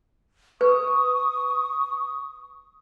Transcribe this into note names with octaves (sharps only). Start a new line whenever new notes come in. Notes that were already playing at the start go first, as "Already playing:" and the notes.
B4 C#6 D#6